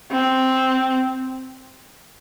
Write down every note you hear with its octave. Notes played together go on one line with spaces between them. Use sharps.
C4